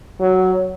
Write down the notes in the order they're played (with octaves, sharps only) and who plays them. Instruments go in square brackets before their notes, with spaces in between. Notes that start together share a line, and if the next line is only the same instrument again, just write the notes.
[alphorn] F#3